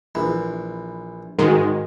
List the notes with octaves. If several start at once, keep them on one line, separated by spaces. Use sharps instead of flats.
A#1 E3
G#2 D#3 G#3 F#4 A#4